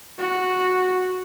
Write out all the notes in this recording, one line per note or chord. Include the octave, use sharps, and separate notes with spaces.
F#4